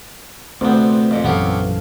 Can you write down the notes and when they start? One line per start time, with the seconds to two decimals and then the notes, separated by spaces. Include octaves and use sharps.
0.61 D2 C3 A3 B3 C5
1.11 F2 A#2
1.24 A#1 F#2 E3 B3 G4 A4 C#5 F5